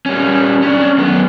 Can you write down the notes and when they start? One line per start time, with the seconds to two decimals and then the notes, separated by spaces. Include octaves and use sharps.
0.06 G3 C#4
0.62 C#4 D4
0.98 F#2 B3